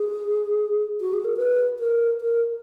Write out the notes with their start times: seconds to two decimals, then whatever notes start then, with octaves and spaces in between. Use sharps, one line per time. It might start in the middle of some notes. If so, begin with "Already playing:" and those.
Already playing: G#4
1.01 F#4
1.13 G#4
1.25 A#4
1.37 B4
1.79 A#4
2.21 A#4